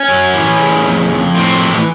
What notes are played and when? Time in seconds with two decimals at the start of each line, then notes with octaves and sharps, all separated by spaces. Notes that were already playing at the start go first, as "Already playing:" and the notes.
Already playing: C#4
0.08 F#2
0.33 E3
0.58 C#3
0.84 F2
1.10 F2
1.34 A2 C4
1.61 E3